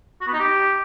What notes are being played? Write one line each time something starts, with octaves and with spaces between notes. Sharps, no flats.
F#4
B3
D#4
G4